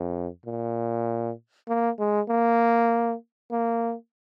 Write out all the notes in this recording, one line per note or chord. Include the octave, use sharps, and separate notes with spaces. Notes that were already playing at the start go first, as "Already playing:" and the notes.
Already playing: F2
A#2
A#3
G#3
A#3
A#3